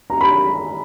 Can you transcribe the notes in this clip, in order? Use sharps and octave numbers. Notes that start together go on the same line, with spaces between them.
A#5
B5